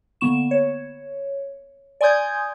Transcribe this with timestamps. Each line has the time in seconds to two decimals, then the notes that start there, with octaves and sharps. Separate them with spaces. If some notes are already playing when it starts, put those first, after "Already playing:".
0.21 D3 A#3 B3 C#6 E7
0.51 C#5
2.01 D5 G#5 C6 D#6 G6 G#6